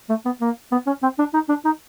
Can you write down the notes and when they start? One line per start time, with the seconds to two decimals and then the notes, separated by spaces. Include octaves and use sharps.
0.09 A3
0.25 B3
0.41 A#3
0.71 B3
0.87 C#4
1.02 C4
1.19 D4
1.33 D#4
1.49 D4
1.65 D#4